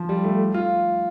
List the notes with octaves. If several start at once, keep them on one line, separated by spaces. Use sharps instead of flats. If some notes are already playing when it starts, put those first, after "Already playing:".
Already playing: F3
G3
A3
F4